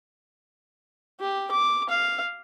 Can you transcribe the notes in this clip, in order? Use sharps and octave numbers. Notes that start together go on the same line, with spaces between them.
G4
D6
F5